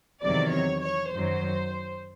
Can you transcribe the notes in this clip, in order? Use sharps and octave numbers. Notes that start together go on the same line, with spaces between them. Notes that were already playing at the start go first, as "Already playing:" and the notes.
E2 C3 D#3 F#3 D5
C#5
C#5
F#2 D#3 F#3 C5